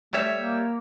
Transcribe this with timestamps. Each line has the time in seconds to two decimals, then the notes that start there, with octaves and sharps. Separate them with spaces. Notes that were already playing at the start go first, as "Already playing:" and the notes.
0.14 G3 A3 C#5 E5
0.35 A#3